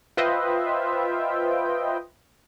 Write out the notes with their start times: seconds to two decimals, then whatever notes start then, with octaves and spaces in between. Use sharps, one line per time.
0.17 F4 B4 C5 D#5 E5 G5